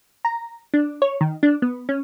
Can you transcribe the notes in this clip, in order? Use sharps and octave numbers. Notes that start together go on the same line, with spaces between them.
A#5
D4
C#5
D#3
D4
B3
C#4